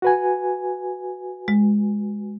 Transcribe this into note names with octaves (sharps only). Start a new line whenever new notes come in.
F#4 B4 G#5
G#3